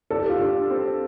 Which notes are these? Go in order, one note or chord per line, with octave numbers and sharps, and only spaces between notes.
A4 D5
G4
F4
D4 G4
C4